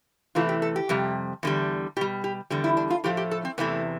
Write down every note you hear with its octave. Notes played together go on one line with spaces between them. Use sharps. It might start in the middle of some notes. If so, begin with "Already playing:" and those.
E2 C3 E3 A3 F4
G4
A4
G4
F2 C3 G3
E2 D3 G3
B2 G3 G4
G4
E2 D3 G3
E4
D4
F4
A2 F3 A3 G4
G4
A4
C4
E2 C3 E3 A3 B3